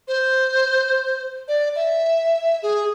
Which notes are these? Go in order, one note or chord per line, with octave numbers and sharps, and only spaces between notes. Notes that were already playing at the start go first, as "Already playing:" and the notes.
C5
D5
E5
G#4